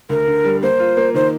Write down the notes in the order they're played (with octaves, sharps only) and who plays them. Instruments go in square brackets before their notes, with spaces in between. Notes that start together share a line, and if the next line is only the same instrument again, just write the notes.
[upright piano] D2 [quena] A#4
[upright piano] D3
G3
[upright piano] A#3 [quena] C5
[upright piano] F4
A#3
[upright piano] D#3 [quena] C5